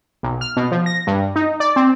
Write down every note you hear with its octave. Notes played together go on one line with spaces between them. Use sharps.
B1
F6
B2
F3
A#6
G2
D#4
D5
C4